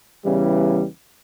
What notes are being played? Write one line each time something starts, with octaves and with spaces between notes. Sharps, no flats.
E2 C#3 E3 G3